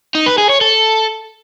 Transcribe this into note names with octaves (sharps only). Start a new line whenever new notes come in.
D#4
B4
G#4
C#5
A4